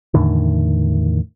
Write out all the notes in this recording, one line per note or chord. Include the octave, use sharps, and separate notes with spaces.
E2 A2 D3 D#3